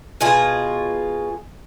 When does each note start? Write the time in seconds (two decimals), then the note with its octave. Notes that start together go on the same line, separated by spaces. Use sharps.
0.21 B2 F4 G#4